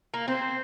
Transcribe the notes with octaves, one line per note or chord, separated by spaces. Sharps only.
A#3
C4 C5